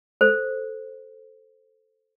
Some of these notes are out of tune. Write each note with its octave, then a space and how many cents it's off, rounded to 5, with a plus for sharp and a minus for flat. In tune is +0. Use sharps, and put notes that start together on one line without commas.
A4 +0 C5 +0